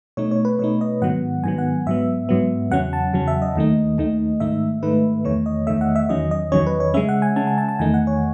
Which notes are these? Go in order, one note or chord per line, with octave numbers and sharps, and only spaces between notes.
B2 A3 D#4 C#5
C#5
B4
B2 A3 D#4 C#5
D#5
G#2 D#3 F#3 B3 F#5
G#2 D#3 F#3 B3 G#5
F#5
G#2 F#3 B3 E5
G#2 F#3 B3
E2 C#3 F#3 C#4 F#5
A5
E2 C#3 F#3 C#4
E5
D#5
D#2 D#3 A3 D#4
D#2 D#3 A3 D#4
G#2 D#3 A3 D#4 E5
G#2 D#3 A3 D#4 B4
E2 D#3 A3 C#5
D#5
E2 D#3 A3 E5
F#5
E5
E2 D#3 F#3 C#4 D#5
D#5
E2 D#3 F#3 C#4 C#5
B4
C#5
C#3 G#3 C#4 E5
F#5
G#5
C#3 G#3 C#4 A5
A5
A5
A5
E2 D#3 A3 D#4 G#5
F#5
C#5